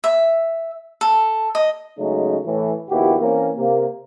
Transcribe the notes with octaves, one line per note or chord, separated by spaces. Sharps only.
E5
A4
D#5
C#3 F#3 G#3 A3 C#4 D#4
A2 E3
A#1 D#2 B3 E4 F#4 G4
E3 A#3 C4 C#4 A#4
C3 A#3